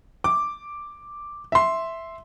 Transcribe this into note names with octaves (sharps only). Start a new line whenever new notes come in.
D6
E5 C6